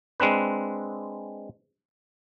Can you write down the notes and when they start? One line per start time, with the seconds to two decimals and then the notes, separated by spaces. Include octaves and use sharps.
0.20 G#3 C4 D4 B4